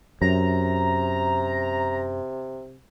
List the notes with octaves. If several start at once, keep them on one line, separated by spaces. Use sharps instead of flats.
F#2 C3 A#5